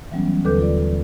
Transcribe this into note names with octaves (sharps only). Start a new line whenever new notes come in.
E3 F#3 G3 B3 C#4
D#2 D3 A4 B4 D6 G6
F4 A4 D5